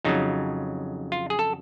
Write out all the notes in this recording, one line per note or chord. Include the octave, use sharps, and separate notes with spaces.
F2 C#3 F#3 D#4
F4
G#4
A4